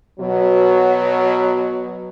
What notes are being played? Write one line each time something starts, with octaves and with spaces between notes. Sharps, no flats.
B2 F#3